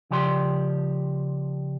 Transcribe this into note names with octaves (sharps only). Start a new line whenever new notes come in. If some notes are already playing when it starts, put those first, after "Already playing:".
C#3 F3 G4 D5 C6